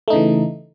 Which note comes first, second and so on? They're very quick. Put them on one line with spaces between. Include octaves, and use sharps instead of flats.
A3 D#4 C#3 E3